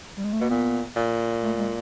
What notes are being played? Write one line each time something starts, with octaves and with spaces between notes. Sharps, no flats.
G3
G#3
A3
B2 A#3
A#2 B3
A#2
A3
G#3